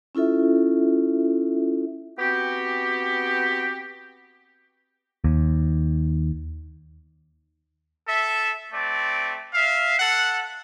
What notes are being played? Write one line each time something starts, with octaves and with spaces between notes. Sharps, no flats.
C#4 E4 F4 A4 E5
B3 C4 F#4 G4
D#2
A4 E5
A3 C4 D5
E5 F5
A4 F#5